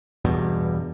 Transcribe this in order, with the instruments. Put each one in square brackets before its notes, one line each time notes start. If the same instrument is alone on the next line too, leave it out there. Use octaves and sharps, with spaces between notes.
[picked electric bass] E2 G2 B2